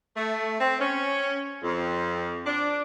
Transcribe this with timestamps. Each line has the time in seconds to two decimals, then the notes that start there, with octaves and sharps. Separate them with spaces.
0.17 A3
0.60 C4
0.80 C#4
1.63 F2
2.46 D4